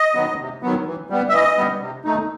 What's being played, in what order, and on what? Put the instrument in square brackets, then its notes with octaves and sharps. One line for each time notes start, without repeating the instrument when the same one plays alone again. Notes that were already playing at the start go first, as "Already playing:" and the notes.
Already playing: [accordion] D#5
D#3 F#3 B3
C3
D#3 F#3 B3
E3
G3 B3
E5
E3 D#5
G3 B3
C3
D#3 A3 D#4